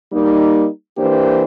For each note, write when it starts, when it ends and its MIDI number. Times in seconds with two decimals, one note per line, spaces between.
0.12 0.66 55
0.12 0.66 58
0.12 0.66 63
0.96 1.44 52
0.96 1.44 58
0.96 1.44 62
0.96 1.44 67
0.96 1.44 72